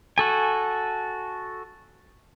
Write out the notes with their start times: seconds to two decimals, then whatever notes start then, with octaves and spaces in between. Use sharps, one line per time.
0.18 F#4 A4 G#5